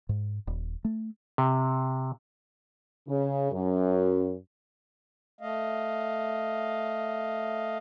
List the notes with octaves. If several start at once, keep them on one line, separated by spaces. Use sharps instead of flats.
G#2
D#1
A3
C3
C#3
F#2
A3 D#5 F5